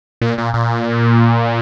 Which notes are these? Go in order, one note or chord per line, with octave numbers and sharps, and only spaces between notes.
A#2
A#2
A#2